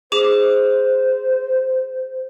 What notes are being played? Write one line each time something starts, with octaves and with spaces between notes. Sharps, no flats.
G#4 C5 D6 E7